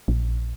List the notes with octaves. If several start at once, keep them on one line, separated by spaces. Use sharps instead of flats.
A#1